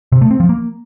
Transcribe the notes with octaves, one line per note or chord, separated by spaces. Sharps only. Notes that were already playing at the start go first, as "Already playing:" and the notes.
C3
A3
C4
F3
A#3